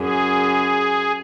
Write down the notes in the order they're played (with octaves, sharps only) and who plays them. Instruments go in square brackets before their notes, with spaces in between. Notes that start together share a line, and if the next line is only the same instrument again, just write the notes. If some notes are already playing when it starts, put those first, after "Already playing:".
Already playing: [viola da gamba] F#2 [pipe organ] G#4